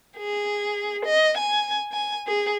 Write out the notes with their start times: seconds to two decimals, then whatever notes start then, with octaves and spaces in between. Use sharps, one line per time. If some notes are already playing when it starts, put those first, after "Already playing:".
0.17 G#4
1.05 D#5
1.38 G#5
1.92 G#5
2.27 G#4